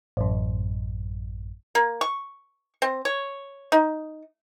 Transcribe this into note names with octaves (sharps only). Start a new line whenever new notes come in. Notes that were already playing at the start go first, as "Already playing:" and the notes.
A1 F#2
A#3
C#6
C4
C#5
D#4